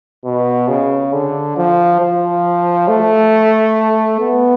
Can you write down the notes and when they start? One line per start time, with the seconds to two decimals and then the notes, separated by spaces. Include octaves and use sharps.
0.25 B2
0.68 C#3
1.13 D3
1.57 F3
2.01 F3
2.88 A3
4.20 B3